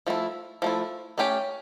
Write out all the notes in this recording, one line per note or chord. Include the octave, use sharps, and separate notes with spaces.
F3 A3 E4
F3 A3 E4
A3 C#4 G4 C#5